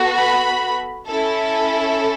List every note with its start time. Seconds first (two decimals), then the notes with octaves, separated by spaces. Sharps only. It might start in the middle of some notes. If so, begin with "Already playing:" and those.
Already playing: B3 F#4 A4
0.16 B5
1.09 C#4 E4 A4